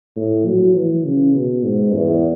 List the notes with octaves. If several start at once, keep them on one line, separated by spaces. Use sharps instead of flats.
A2
F#3
E3
C#3
B2
G#2
E2